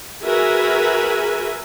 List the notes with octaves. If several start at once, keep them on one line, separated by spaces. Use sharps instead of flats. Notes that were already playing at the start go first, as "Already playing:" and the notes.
F#4 G#4 A#4 B4 E5 G#5